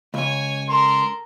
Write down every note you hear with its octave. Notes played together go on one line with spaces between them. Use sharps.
C#2 C#5 G#5
A4 A#4 C6